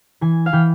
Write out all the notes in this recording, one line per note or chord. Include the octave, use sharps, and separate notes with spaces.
E3 G#5
F5
E3 G5